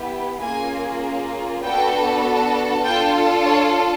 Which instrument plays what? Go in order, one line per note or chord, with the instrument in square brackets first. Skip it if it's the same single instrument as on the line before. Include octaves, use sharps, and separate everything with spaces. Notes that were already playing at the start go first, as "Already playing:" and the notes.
Already playing: [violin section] B3 E4 G4
A#3 C#4 F4 G#4 G#5
B3 D4 F#4 A4 G5
D4 F4 A4 G5
C#5